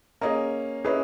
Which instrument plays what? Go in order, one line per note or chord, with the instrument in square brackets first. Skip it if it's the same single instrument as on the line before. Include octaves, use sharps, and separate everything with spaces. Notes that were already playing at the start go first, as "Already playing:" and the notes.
[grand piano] A#3 C#4 [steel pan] G#4 D#5 A#5
[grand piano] C#4 E4 [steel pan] G#4 B4 D#5